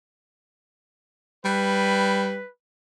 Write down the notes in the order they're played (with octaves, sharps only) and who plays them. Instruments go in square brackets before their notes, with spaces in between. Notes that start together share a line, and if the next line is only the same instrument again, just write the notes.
[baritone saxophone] G3 [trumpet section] B4